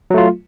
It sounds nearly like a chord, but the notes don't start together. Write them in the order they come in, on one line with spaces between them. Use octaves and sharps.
F#3 A3 F4